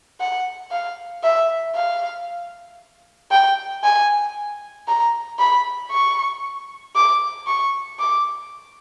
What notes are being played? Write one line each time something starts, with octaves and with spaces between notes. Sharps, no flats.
F#5
F5
E5
F5
G5
G#5
A#5
B5
C#6
D6
C#6
D6